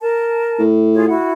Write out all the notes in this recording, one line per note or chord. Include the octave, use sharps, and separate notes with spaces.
A#4 A5
A2
F4 G#4 C#5
E4 F#4 F#5